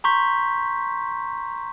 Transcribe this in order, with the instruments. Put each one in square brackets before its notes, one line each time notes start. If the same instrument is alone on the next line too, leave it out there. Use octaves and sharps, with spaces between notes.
[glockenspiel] A#5 C6 C#6 G6 B6